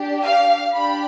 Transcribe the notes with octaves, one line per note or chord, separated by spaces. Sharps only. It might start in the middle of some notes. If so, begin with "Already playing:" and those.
Already playing: D4 G4
F5
D4 G4 B5